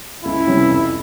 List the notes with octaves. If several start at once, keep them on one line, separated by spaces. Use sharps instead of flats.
C#2 E4
C3 E3 G3 C#4
F2